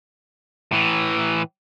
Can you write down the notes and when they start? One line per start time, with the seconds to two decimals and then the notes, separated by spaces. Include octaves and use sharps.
0.72 A2 E3